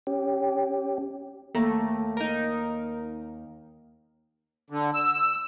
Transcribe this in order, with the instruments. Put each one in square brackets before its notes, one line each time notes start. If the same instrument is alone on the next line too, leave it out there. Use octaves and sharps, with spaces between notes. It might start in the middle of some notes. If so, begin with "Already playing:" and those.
[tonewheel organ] C#4 G4
[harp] D#2 A#3 A#5 [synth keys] A3
[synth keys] D#4 A#4
[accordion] D3
E6